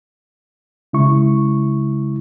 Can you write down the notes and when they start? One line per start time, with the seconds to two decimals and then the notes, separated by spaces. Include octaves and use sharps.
0.93 C#3 G#3 E4 C#6